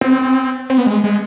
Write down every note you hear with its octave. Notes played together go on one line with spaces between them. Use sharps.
C4
C4
B3
G#3
G#3